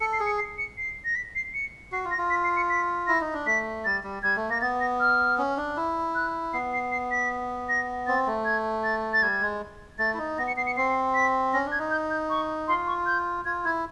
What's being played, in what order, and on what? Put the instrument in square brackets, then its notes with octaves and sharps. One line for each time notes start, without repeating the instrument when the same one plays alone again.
[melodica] A4 [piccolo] C#7
[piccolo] C7
[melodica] G#4
[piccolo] C#7
C7
C#7
C7
A#6
B6
C7
C#7
[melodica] F#4 [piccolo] C7
[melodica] F4
[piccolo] A#6
[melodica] F4
[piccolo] B6
C7
C#7
B6
[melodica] E4 [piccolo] A#6
[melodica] D#4
D4
[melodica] A3 [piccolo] B6
[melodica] G3 [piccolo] A6
[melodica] G3
[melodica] G3 [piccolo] G#6
[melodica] A3
[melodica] A#3 [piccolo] A#6
[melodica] B3 [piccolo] A6
[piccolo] A#6
F6
[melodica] C#4
D4
E4
[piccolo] F#6
[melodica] B3 [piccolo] C7
[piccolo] C7
C7
B6
A#6
[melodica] C4 [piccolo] A6
[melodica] A3
[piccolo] G#6
A6
A6
[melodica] G3 [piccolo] G#6
[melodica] G#3
[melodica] A3 [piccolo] A6
[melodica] E4
D#4
[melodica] B3 [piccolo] A#6
[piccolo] C#7
[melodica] B3 [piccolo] C7
[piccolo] C#7
[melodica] C4 [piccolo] C7
[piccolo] B6
[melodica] C#4 [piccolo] A#6
[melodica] D4
[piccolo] G#6
[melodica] D#4
[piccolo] G6
G6
C#6
[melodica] F4 [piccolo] C6
[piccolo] C#6
G6
[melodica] F4 [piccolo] G#6
[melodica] E4 [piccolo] G#6